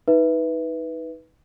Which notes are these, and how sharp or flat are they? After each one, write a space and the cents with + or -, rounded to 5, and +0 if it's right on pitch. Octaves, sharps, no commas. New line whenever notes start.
D#4 +25 B4 -5 E5 +0